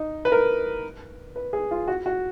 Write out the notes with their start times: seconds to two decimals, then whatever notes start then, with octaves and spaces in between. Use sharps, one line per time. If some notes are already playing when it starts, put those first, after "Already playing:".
Already playing: D#4
0.25 B4
0.32 A#4
1.36 B4
1.53 G#4
1.71 F4
1.88 F#4
2.06 F#4